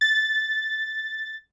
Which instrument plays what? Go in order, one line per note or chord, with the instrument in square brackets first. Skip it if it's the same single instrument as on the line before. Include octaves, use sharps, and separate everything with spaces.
[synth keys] A6